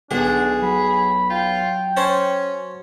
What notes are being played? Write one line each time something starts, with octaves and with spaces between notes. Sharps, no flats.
B1 D3 D4 G#4 F#5
F#3 B5
F4 G5
C#4 C5 C#5 A5